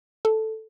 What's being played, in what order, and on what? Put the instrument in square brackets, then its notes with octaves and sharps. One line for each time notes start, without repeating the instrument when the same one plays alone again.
[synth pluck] A4